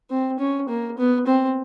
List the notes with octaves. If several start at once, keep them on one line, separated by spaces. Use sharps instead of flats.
C4
C#4
A#3
B3
C4